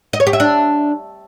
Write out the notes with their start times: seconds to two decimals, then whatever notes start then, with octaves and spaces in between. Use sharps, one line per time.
0.13 D#5
0.20 C#5
0.27 G4
0.33 E5
0.40 D4